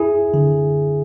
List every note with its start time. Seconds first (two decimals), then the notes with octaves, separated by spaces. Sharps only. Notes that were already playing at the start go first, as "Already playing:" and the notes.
Already playing: E4 G#4
0.34 D3